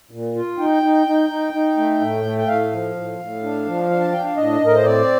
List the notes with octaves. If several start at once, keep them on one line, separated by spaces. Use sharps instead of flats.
A#2
F4
D#4 G5
D#4
D#4
D#4
D#4
A3
A2
A3
G5
A2 F5
F3
A2
A2
D4
F3
D4
A5
D4 G5
F5
A2 D#5
A2 A#4
C5
C4 D5